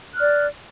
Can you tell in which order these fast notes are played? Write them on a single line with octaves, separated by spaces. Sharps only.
F#6 F6 D5